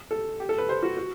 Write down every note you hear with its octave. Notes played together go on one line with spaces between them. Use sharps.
A4
G4
A4
B4
C5
F#4
F#4